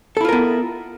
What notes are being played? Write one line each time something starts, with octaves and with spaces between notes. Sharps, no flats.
B3 E4 F4 A4 A#4